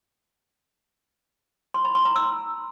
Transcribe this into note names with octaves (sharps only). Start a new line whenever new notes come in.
C6
B5
C6
A#5
E6